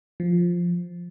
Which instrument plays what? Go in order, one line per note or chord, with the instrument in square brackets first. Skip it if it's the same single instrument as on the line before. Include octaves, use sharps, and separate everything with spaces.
[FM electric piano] F3